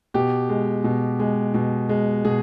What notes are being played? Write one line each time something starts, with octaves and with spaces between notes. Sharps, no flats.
B2 G4
G#3
B2
G#3
B2
G#3
B2 G#4